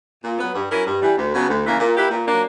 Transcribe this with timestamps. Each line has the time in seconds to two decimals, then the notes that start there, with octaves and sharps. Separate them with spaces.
0.24 A#2
0.38 F#3 B3
0.54 G2
0.70 F#3 C#4 E4 A#4
0.85 G2
1.01 E3 G3
1.17 D2
1.33 C#3 F#3 B3 D4
1.49 D2
1.64 C#3 E3 A#3
1.79 A#2
1.95 A#3 E4 G4 B4
2.10 A#2
2.26 F#3 A#3 D4